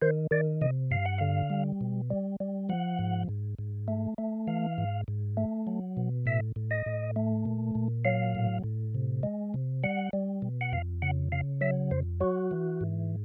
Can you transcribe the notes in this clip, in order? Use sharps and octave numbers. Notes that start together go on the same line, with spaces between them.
D#3 C5
D#3 D5
C3 D#5
G2 F5
F#5
D3 F5
G3
B2
G3
G3
F3 F#5
G#2
G#2
G#2
A3
A3
E3 F5
G#2
G#2
A3
F#3
B2
A2 E5
A2
D#5
A2
A3
A#2
A#2
F#3 F5
A2
A2
C3
G#3
C3
G3 F#5
G3
B2
F#5
F2 F5
C#3 F#5
C#3 F5
F#3 E5
F2 C5
F#3 F#4
E3
G#2